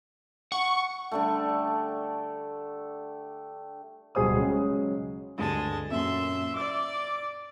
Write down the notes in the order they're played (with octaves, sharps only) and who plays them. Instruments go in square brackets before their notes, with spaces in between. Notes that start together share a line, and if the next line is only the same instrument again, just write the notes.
[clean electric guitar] F#5 [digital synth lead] C#6
[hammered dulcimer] D3 G3 A3
[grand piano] D1 B2 G3 G#4 C5 D#6
C#3 F#3 G#3
[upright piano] D2 G2 [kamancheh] G#3 A5
[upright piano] F#2 A#2 [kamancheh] E5 C6
[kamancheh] D5 D6 [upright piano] E6